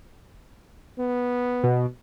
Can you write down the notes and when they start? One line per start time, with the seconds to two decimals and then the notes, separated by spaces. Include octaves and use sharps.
0.98 B3
1.63 B2